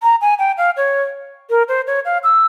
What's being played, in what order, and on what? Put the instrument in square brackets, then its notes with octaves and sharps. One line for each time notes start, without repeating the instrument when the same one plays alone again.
[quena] A#5
G#5
G5
F5
C#5
A#4
C5
C#5
F5
E6